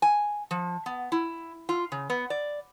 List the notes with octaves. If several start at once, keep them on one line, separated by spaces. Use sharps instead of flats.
G#5
F3
B3
E4
F4
C#3
B3
D5